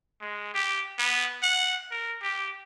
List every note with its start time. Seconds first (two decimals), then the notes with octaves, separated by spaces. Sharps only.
0.21 G#3
0.54 G4
0.98 B3
1.42 F#5
1.91 A#4
2.22 G4